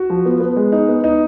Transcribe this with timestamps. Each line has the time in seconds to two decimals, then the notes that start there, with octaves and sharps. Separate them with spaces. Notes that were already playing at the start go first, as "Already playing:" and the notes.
Already playing: F#4
0.10 F3
0.26 B3
0.40 B3
0.57 G#3
0.72 D#4
0.89 B3
1.04 D#4